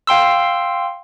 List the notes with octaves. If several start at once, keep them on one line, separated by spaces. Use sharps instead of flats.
F5 G5 C6 E6